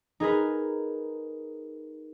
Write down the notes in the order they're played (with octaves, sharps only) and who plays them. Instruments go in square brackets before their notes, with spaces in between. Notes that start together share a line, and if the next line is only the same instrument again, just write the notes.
[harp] D#4 G#4 A#4 B4